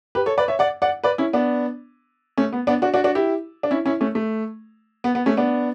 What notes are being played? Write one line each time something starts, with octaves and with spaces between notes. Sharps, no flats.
G4 B4
A4 C#5
B4 D5
C#5 E5
D5 F#5
D5 F#5
B4 D5
C#4 E4
B3 D4
A3 C#4
B3
B3 D4
D4 F#4
D4 F#4
D4 F#4
E4 G4
D4
C#4 E4
C#4 E4
A3 C#4
A3
B3
B3
A3 C#4
B3 D4